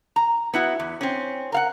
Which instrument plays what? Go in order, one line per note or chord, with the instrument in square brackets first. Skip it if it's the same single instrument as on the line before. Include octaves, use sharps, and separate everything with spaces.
[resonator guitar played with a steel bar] A#5
B3 E4 F#4
E2
C4 C#4
A#4 F5 F#5